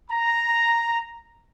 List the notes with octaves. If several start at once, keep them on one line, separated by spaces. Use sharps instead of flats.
A#5